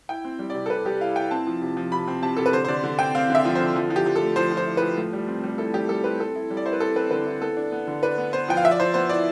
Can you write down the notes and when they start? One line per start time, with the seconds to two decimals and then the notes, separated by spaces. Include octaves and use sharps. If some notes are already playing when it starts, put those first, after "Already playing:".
0.09 E4 G5
0.25 C4
0.39 G3
0.50 C3 D5
0.66 A4
0.70 C3 B4
0.85 G3 G4
1.01 E4 F5
1.16 E4 G5
1.31 C4 A5
1.47 F3
1.62 C3
1.77 F3
1.92 C3 B5
2.08 C4
2.22 C3 A5
2.37 C3 A4
2.46 B4
2.53 D3 C5
2.65 C5
2.68 D3 D5
2.84 D3
2.99 C4 G5
3.15 C4 F5
3.30 D3 E5
3.45 F3
3.55 D3 C5
3.76 F3
3.90 F3
3.96 G4
4.06 F3
4.16 A4
4.22 A3
4.36 F3 C5
4.51 F3
4.57 C5
4.67 E4
4.77 F3 B4
4.98 A2
5.13 G3
5.28 C4
5.44 G3
5.58 E4 A4
5.74 G3 G4
5.89 G3 A4
6.04 C4 B4
6.20 C4 A4
6.35 E4
6.50 G3
6.57 D5
6.66 E4 C5
6.73 B4
6.80 C4 A4
6.96 C4 B4
7.11 D3 B4
7.27 E4
7.41 B3 A4
7.57 D4
7.72 B3
7.87 D3
8.03 D4 B4
8.18 B3
8.33 B3 C5
8.48 F3 G5
8.57 F5
8.64 F3 E5
8.71 D5
8.80 F3 C5
8.94 B3 C5
9.09 E4 D5